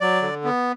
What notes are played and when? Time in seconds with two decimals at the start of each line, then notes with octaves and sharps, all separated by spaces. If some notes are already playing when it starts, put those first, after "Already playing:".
0.01 F#3 D5
0.22 D3
0.45 B3